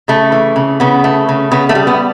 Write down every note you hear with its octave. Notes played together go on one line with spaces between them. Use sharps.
C#3 A3
E3
C#3
C#3 B3
A3
C#3
C#3 B3
A3
G3
B3